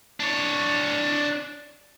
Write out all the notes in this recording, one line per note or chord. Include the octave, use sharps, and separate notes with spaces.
D4 C#5